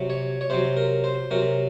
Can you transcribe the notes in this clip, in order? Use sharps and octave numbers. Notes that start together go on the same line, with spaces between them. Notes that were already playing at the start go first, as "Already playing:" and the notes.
Already playing: C3 F#3
C#5
C#5
C3 F#3 C5
A#4
C5
C3 F#3 A#4